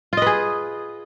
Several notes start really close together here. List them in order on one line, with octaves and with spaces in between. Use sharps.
F4 D#5 B4 G#4